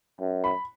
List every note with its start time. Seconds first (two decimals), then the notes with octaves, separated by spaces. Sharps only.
0.21 F#2
0.44 B5